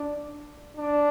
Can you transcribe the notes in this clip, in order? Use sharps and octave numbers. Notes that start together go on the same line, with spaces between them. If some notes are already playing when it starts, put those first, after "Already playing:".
Already playing: D4
D4